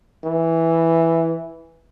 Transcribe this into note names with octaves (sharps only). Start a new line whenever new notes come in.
E3